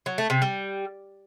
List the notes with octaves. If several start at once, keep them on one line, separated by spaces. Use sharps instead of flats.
F#3
A3
C3
G3